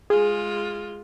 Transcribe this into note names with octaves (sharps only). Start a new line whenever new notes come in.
G#3 F4 G#4